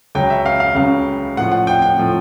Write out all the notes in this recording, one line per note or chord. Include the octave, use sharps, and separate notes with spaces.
C#2 C#3 F#3 G5
E5
F5
F5
C#2 C#3 F#3 F5
A2 F3 F#5
F#5
G5
G5
A2 F3